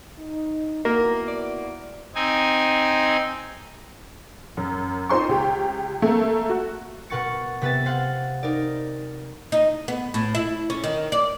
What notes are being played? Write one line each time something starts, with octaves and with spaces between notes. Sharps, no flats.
D#4
A#3 B3 E4 F#4 A#4
D5
C4 D#4 G#5
F#2
D#4 F4 C5 C6 C#6
C#2 G4
A3 A#3
F#4
B2 A#4 F#5 C#6 A6 C#7
C3 B3 B4 E5 A6
C5 F5 F#5
D#4 A#4 D5
D#4
B3
A2
E4
C#4
D#3
D5